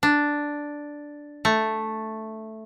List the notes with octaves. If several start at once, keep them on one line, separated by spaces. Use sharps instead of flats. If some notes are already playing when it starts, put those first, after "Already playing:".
D4
A3